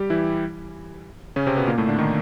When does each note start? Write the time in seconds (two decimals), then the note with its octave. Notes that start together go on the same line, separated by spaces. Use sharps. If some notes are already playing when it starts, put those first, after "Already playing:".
Already playing: G3 G4
0.10 E3 E4
1.36 C#3 C#4
1.47 C3 C4
1.57 B2 B3
1.67 A#2 A#3
1.78 A2 A3
1.89 D3 D4
1.99 D#3 D#4